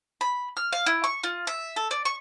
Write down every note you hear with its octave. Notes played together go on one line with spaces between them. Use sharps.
B5
F6
F5
E4
C#6
F4
E5
A4
D5
C#6